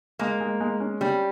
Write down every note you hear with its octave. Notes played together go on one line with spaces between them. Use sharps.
G#3 A#3
G#3
G#3
C#4
G3 C#4